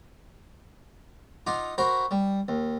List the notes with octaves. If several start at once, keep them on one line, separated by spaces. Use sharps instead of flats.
D#4 F4 F#5 D6
F#4 A#4 C5 B5
G3
D#2